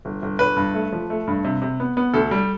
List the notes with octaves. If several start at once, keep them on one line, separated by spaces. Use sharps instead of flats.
G1
G1
G1 B4
G2
A3
F3
A3
G2
C3
C3
B3
B3
D2 A4
G3